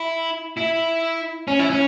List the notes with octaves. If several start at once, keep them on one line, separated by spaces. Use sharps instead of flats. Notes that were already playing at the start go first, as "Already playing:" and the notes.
Already playing: E4
E4
C#4
E4
C#4